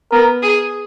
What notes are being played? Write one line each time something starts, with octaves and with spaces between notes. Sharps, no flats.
B3 A#4
G#4